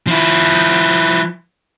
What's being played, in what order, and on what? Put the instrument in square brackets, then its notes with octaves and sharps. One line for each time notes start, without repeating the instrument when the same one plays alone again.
[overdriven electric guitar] F3 E4